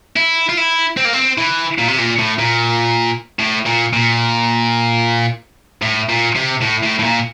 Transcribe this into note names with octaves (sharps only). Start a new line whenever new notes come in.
E4
F4
E4
C4
A#3
C4
E3
A#2
C3
A#2
A2
A#2
A2
A#2
A#2
A2
A#2
C3
A2
A2
A2
A#2